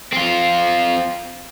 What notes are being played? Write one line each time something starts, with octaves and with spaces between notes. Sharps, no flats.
C4 F4